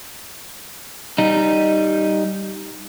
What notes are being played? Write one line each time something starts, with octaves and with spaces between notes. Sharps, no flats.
G3 D#4